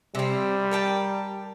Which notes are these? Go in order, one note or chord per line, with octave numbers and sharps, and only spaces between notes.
C3 G3 C4
A#4 G5 A5